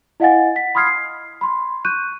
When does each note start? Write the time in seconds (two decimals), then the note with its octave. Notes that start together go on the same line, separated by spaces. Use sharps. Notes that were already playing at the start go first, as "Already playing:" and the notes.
0.20 E4 D#5 F5 F#5 G#5 A6
0.56 B6
0.75 B5 C6 D#6 F6 G#6 C7
0.86 C7
1.41 B5 C6
1.85 C#6 F#6 G6 D#7